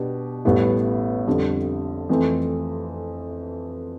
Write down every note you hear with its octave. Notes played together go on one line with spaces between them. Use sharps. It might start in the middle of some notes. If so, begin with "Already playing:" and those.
Already playing: B2 B3 D4 G4
A1 A2 G3 B3 E4
F2 D3 G3
F2 E3 A3 C4